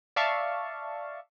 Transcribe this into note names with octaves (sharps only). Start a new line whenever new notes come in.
D5 E5 F5 A5 C#6